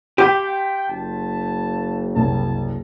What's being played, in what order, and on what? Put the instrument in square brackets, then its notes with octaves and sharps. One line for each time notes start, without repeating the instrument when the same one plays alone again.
[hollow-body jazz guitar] G4 [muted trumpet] G5 [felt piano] C6 G6 B6
[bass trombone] F#1 [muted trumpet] A5
[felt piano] C2 F#2 [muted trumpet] A5